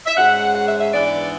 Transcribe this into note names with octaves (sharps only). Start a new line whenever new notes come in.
E5
G#2 G#3 C#4 F#5
F#5
E5
E5
G#2 E3 B3 D4 D5